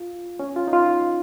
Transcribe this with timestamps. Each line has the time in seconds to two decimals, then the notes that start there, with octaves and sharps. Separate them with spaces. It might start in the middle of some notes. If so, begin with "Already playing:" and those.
Already playing: F4
0.39 C#4
0.56 F4
0.68 D#4
0.73 F4